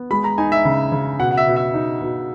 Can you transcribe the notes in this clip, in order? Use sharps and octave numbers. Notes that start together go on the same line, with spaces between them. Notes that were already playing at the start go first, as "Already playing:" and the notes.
Already playing: B3
G#3 B5
A#5
D#4 G#5
E5
C#3
C#3
B2 F#5
F#5
E5
B2
E5
D#4
B2